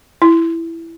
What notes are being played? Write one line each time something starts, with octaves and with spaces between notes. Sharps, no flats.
E4